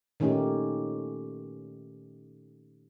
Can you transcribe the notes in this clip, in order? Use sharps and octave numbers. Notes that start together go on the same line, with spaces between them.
A#2 D#3 A3 C#4 D#4 G4